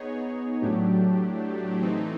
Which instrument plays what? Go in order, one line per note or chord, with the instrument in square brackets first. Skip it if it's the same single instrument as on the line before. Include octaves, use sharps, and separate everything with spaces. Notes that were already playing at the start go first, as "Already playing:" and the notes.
Already playing: [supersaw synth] B3 D#4 G#4 C#5
A2 F#3 A3 D4 G4
E3 A3 C4 D#4